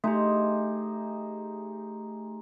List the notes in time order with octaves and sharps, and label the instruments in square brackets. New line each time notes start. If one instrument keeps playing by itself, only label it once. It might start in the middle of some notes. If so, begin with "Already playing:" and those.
[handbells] A3 G4 [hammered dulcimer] D#4 G#4 C5